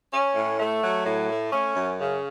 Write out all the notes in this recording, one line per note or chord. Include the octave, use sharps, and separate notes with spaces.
C#4
A2
A3
F#3
A2
A3
C#4
F#2
C#3